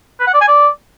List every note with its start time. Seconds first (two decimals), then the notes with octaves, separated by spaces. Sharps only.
0.20 B4
0.27 F#5
0.34 D5
0.41 G#5
0.48 D5